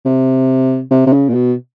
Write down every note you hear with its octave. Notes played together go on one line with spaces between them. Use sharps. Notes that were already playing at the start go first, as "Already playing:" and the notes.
C3
C3
C3
C#3
A#2
B2